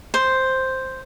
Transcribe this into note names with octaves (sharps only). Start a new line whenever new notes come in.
C5